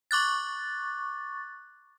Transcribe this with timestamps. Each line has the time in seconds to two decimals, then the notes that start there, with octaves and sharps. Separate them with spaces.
0.11 C#6 D6 F#6 A6